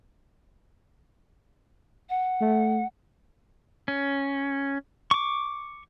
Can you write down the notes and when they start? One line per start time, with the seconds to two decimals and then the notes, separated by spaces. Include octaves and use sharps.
2.09 F#5
2.41 A3
3.88 C#4
5.11 C#6 D6